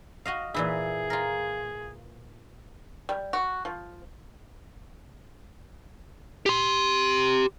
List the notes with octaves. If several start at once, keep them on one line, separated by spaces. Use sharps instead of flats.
F#4 D#5 F5
A#2 E3 E4 G#4
F4 A#4
G3
F#4
F3
G4 C6